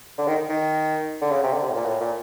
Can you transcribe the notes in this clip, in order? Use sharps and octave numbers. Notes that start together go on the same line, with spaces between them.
D3
D#3
D#3
D3
C#3
C3
D3
C3
A2
A#2
A2
A#2